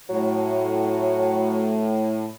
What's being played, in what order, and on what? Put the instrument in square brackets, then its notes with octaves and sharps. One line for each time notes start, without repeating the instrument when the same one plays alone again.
[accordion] A2 [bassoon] F#3